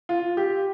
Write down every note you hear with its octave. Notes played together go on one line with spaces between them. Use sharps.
F4
G4